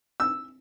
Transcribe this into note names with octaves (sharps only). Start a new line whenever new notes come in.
E6